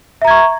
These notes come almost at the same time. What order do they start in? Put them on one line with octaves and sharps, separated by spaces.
E5 A#5 G#6 C#6